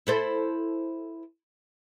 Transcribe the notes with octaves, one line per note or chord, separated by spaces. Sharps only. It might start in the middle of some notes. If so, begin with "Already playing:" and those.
E4 A4 C5